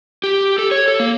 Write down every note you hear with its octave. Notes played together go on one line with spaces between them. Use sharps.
G4
A4
C#5
A4
A#3